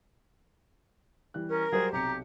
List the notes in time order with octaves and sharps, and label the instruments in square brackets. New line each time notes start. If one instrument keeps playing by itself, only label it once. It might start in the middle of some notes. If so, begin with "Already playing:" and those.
[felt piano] E3 G3 F#6
[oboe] C#4 [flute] A#4
[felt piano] F#3 G3 C5 [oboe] G#4
[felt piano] B1 C3 C#7 [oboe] G4 [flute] A#5